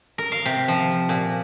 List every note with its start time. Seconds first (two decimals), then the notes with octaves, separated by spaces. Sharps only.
0.18 A#4
0.32 F5
0.46 C3
0.68 F3
1.09 A#2